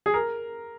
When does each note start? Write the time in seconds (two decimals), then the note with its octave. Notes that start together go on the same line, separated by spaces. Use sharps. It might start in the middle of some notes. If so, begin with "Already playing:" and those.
0.06 G#4
0.14 A#4